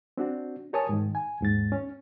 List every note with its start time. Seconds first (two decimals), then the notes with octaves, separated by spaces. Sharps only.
0.18 C4 D4 F#4
0.73 G4 A#4 C#5 G#5 A5 D#6
0.89 G#2 D#3
1.15 G#5
1.41 D#2 G#2 A6
1.72 C#4